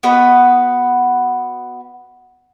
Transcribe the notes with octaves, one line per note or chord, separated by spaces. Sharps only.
B3 F#4 B4 D#5